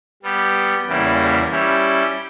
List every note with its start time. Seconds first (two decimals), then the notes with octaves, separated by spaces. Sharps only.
0.22 G3 B3 G4
0.87 E2 C#3 G3 A#3 E4
1.51 G3 C#4 E4 G4